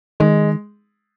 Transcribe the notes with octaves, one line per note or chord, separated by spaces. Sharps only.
D#3 G#3